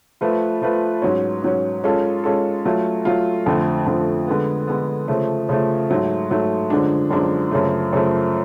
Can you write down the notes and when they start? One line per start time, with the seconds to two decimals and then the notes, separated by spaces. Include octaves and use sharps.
0.21 F3 A3 F4 B4
0.62 F3 A3 F4 B4
1.02 G#2 F#3 C#4
1.43 G#2 F#3 C#4
1.84 G#3 C#4 F4 A4
2.24 G#3 C#4 F4 A4
2.65 F#3 A3 F4
3.05 F#3 A3 F4
3.46 F2 D3 F3 A3
3.86 F2 D3 F3 A3
4.27 D3 G#3 B3
4.68 D3 G#3 B3
5.08 C#3 F3 A3
5.49 C#3 F3 A3
5.90 G#2 F#3 A3
6.30 G#2 F#3 A3
6.70 F#2 D3 F3 G#3 D4
7.11 F#2 D3 F3 G#3 D4
7.51 F#2 C#3 F3 A3
7.93 F#2 C#3 F3 A3